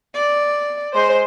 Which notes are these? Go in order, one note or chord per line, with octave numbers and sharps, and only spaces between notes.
D5
G#3 C5